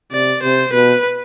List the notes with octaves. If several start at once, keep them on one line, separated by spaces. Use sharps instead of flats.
C3 D5
C3 C5
B2 B4